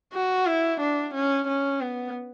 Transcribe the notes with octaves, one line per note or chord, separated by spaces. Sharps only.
F#4
E4
D4
C#4
C#4
B3